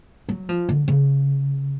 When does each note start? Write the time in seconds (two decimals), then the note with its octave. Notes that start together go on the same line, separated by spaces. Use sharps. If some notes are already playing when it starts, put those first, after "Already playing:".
0.29 F#3
0.49 F3
0.69 D3
0.88 C#3